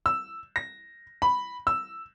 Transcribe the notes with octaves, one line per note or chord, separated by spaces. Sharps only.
E6
A#6
B5
E6